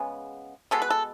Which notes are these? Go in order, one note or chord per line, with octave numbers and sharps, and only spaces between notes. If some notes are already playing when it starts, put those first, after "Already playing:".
Already playing: C#3 G#3 B3
B2 G#3 B3 A4
B4
A4